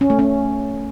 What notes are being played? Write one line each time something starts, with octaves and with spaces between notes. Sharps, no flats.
C#4
A3
C#4